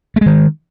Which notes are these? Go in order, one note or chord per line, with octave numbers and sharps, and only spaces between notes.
D#3 G#3 A3